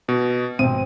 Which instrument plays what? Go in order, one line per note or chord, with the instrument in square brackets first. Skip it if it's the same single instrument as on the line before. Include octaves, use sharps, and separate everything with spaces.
[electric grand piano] B2
[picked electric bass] G#1 B2 [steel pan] C4 [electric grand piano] D#7